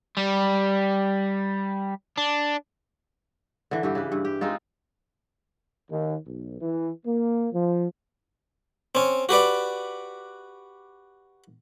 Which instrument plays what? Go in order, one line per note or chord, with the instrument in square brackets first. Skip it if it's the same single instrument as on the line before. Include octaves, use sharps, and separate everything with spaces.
[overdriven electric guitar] G3
D4
[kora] D3 E3
G2 E3 G4
C#3 B4
G2
G4
G#3 C4 D#4 F4
[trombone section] D#2
B1
E3
A#3
F3
[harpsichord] C4 C#4
F#4 G4 B4 D5